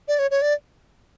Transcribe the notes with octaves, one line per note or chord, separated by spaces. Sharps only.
D5
C#5
C#5
D5